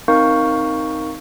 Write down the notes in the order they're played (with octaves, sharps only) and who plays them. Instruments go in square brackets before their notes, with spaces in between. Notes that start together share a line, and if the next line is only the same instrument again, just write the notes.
[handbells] C4 D#4 A#4 F5 C#6 G6